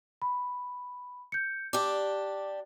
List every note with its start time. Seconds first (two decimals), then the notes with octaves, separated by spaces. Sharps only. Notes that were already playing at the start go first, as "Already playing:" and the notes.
0.22 B5
1.32 G6 C#7
1.73 D4 G4 D6